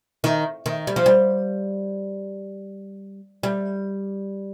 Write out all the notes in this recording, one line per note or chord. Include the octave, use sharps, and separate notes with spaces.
D#3
D#3
G3
F3
G3
G3